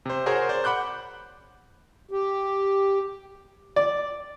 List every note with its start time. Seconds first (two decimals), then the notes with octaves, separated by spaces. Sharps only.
0.06 C3 C5
0.26 F#4 G#4 A#4 C5 C#5
0.49 C5 D5
0.64 F#5 B5 D6 F#6 G6
2.11 G4
3.76 D5